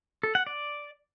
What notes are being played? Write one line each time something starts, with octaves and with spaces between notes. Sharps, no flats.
A4
F#5
D5